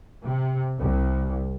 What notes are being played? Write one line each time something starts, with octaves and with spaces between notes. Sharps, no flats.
C3
C2